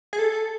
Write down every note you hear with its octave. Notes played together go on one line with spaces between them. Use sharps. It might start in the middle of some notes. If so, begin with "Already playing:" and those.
G#4
A4